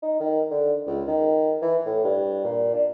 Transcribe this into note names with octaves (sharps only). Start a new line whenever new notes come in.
D#4
D#3
D3
C#2
D#3
E3
A2
G2
A#2
D4